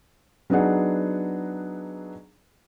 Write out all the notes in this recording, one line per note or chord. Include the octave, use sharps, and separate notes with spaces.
F#3 B3 D4 D#4 G#4 F#5